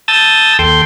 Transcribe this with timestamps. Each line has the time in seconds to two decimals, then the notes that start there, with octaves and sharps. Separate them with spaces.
0.08 A5 D#6 E6 G6 A6
0.59 D#2 A4 G5 C6 G6